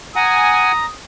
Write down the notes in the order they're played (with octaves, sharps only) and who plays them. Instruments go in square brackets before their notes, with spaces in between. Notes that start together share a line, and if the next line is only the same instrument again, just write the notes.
[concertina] F#5 [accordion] G#5 [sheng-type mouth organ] A#5 [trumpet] D#6